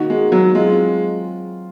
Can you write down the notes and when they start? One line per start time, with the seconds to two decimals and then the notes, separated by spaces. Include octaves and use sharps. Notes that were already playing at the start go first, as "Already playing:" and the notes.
Already playing: D#3 A#3 D#4 F#4
0.10 G#3
0.32 F#3
0.55 F#3 G#3 C4 F4